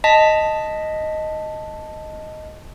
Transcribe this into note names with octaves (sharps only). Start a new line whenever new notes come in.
D#5 A5 B6